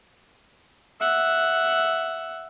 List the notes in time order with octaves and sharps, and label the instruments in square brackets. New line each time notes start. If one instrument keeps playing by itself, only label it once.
[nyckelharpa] E5 F#5